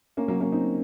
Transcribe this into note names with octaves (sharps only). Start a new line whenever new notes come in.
A#3 C#4
F#3 A#3
A#3 C#4
C4 D#4